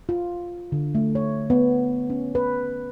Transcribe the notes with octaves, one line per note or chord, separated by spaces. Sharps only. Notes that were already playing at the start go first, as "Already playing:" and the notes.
F4
D3
A3
C#5
B3
C#4
B4